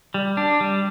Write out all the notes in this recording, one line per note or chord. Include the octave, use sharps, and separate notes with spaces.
G3
D4
G3